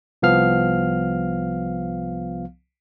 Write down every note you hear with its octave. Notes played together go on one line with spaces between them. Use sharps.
C2 F3 B3 F5 F6